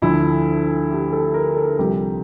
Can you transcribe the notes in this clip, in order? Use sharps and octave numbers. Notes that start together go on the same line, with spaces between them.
D2 D3 F3 E4
G4
A4
A#4
A4
C2 C3 F3 G4